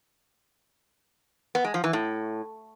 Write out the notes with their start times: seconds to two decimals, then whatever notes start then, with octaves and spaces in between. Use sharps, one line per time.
1.55 B3
1.64 G#3
1.74 F3
1.84 E3
1.93 A2